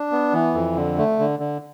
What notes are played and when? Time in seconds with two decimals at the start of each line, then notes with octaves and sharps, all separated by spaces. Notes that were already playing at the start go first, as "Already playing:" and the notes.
Already playing: D4
0.12 B3
0.33 E3
0.54 F2
0.76 D3
0.98 A3
1.19 D3
1.39 D3